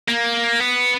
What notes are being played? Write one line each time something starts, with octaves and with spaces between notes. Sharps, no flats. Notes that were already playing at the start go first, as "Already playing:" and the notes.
A#3
B3